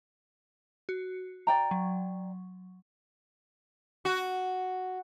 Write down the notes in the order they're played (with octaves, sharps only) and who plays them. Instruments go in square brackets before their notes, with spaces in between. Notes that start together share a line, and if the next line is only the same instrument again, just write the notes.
[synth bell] F#4
[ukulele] D5 G5 A#5
[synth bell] F#3
[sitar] F#4